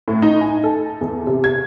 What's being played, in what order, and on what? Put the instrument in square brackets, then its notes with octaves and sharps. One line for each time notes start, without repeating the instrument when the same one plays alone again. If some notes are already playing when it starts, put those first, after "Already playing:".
[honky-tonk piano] A2
D#4
G#5
A4
E2
C3
G#6